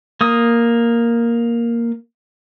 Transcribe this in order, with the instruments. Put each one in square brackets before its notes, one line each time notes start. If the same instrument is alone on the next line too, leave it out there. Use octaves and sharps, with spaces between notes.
[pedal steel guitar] A#3 D#6